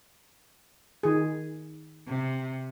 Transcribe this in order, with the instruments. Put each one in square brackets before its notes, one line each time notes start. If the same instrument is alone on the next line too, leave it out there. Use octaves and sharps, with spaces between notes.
[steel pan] D#3 G#4
[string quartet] C3